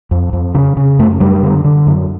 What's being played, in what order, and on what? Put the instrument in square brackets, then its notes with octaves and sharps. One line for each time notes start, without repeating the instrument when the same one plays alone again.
[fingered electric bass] F2
F2
C#3
C#3
F#2 A3
F#2 G3
D3
D3
F#2